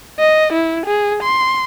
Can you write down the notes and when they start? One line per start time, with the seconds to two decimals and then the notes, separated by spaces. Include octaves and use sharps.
0.19 D#5
0.53 E4
0.86 G#4
1.23 C6